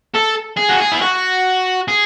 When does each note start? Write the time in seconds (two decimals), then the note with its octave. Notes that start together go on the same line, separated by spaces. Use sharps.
0.15 A4
0.57 G#4
0.69 F#4
0.80 G#4
0.92 E4
1.01 F#4
1.88 G#4